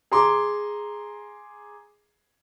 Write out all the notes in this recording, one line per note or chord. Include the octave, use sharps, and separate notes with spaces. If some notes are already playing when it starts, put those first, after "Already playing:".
G#4 A#5 C6 D6